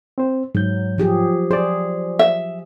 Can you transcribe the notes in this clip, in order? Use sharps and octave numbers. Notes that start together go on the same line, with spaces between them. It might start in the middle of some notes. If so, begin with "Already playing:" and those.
C4 C5
G#2 F#3 G6
F3 G4 G#4
G#4 C5 D5
E5